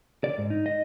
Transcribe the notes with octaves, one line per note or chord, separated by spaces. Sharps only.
D5
G#2
D#4
D#5